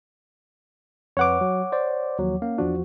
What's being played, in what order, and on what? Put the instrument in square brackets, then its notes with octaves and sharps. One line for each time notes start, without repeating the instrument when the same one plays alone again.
[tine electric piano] F2 B4 [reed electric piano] C#5 F#5 D6
[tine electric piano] F#3
C5 D5
D#2 F3 F#3
A#3 C#4 F5
[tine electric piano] E2 F3 F#4 [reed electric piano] D4